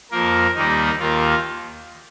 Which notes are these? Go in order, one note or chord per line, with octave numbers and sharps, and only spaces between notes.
F2 F3 A#3 A#4
D#2 D#3 G3 A#3 D#4
D#2 D#3 A#3 F4